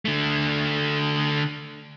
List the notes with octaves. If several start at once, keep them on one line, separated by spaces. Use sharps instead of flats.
D3 A3